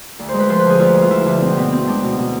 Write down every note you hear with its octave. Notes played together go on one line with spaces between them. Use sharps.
D2
C5
G#3
B4
F3 C5
B4
D3 G#4
D2 F4
G#3
F4
F3 E4
D3 E4
B2 C4
B2 B3
B3 C4
G#3 D4
B2
B2